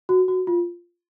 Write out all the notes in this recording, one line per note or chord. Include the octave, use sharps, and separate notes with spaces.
F#4
F#4
F4